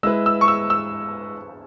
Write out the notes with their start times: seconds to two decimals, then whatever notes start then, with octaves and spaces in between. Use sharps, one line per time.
0.03 G#3 E4 B4 E6
0.26 E6
0.41 C#6
0.48 E6
0.70 E6